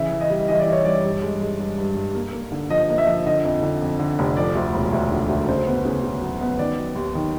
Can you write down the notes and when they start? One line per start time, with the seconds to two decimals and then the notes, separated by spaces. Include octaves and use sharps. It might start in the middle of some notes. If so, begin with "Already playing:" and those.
Already playing: C#3 E3 E5
0.11 E3
0.21 D#5
0.30 G3
0.48 E3 D#5
0.60 D5
0.67 E3
0.72 C#5
0.85 G3 D5
1.05 G2
1.22 G#3
1.41 G#3
1.60 G2
1.78 G2
1.97 G2
2.15 A#3
2.33 A#3
2.52 D3
2.70 F3 D#5
2.89 A#3
2.98 E5
3.07 F3
3.26 D3 D#5
3.45 F2
3.63 D3
3.82 F2
3.99 D3
4.19 F1
4.37 F3 D5
4.55 D2
4.74 E1
4.93 D2
5.11 D3
5.29 D2
5.49 C#3 C5
5.67 B3
5.85 C#3
6.04 C#3
6.22 F#3
6.41 B3
6.59 D#3 D5
6.78 F#3
6.96 D#2
7.15 D#3